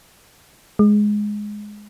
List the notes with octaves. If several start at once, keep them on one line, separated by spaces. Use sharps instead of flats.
G#3